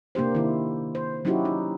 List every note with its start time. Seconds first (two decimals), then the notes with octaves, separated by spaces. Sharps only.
0.15 C3 A#3 D4 G4 C5
0.35 D#3 E4
0.95 C5
1.25 F#3 C#4 D#4 E4 F#4 G4
1.45 D#4